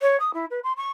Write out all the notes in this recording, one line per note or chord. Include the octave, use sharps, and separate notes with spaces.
C#5
D#6
E4
B4
C6
C#6